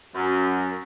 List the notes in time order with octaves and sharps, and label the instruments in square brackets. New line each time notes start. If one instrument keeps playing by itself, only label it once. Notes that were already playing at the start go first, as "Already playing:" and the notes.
[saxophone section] F#2